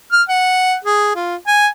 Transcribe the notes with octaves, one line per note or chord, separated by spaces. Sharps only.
F6
F#5
G#4
F4
G#5